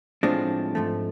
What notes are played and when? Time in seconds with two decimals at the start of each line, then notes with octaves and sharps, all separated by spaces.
0.23 A2 F3 G#3 C4 D4
0.75 G#2 F3 A3